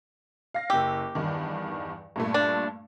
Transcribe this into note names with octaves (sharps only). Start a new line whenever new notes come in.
F5 A#6
F#1 G4 E6
E2 G2 D#3
G2 A#2 A3
D4